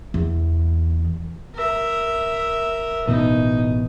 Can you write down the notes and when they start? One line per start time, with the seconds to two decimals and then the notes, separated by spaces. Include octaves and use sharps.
0.14 E2
1.55 A#4 E5
3.07 A1 B2 A3 D#4